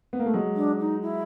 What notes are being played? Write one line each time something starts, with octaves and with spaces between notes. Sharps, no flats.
B3
A#3
A3
F#3 G#3
D4
D#4
E4